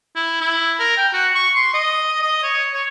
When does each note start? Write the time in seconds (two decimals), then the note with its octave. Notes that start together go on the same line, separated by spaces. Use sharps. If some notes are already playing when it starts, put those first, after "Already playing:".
0.16 E4
0.41 E4
0.79 A#4
0.97 G5
1.13 F#4
1.35 C#6
1.56 C6
1.74 D#5
2.22 D#5
2.43 C#5
2.73 C#5